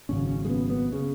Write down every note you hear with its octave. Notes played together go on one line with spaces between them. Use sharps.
G#1 F#2 C#3 C#4
C#4
G#3
B3
B3
C#3